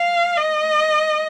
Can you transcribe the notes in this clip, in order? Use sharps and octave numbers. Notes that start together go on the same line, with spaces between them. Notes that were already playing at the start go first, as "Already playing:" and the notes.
Already playing: F5
D#5